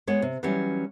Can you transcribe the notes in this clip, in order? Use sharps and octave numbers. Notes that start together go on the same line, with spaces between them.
G#3 B3 C#5
C3
E3 F#3 G3 C#4